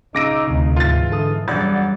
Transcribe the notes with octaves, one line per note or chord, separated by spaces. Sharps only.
C#3 D#4 D6 E6 A#6 D7
D2 C3
G#2 E3 F4 A6
D3 A4 D#6
E1 F#2 G3 D5 F#5 A6